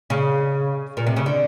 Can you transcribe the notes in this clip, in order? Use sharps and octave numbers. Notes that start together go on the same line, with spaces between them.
C#3
A#2
C3
C#3
D3